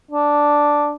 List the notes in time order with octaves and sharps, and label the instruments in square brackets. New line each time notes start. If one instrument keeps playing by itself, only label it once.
[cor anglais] D4